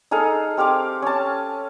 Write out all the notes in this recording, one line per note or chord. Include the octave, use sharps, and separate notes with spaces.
D#4 G#4 A4 F5
C4 G4 F5 D6
C#4 A5